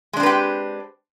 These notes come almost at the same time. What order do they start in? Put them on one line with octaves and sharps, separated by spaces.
G#3 D4 C4 B4 G4